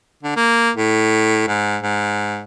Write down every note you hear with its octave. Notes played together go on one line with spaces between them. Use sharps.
D3
A#3
A2
G#2
G#2